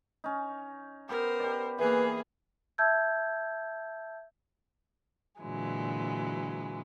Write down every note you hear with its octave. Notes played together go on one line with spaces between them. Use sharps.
C#4 D#4
B3 G4 A#4 C5
G4 D5
E3 A#3 G#4 B4
E5 A5 E6 G6 G#6
A#2 D3 E3 F#3 G#3